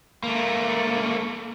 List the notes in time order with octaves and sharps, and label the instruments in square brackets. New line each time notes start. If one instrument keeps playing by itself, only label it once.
[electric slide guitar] A3 A#3